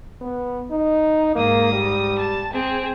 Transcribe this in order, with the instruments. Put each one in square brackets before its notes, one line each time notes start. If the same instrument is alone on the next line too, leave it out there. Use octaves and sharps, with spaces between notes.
[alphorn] B3
D#4
[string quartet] G#2 D#6 [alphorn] A#3
[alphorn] G3
[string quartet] A5
C4 G#4